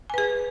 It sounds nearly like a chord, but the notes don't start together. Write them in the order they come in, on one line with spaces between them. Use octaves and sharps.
G#5 B4 G#4